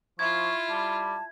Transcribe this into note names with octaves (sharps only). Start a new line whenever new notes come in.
F3 E4 F4 C#6 G#6
G3 A5